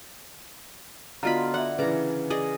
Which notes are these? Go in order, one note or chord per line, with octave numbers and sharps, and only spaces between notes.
D3 B3 F4 F#4 D#5 F5 A#5 B5
D5 E5 F#5
C#3 E3 B4 D5 A#5
G#4 D5 D#5